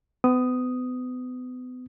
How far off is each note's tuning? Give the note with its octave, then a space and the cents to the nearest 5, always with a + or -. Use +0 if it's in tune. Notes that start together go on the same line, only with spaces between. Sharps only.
B3 +35 D#6 +0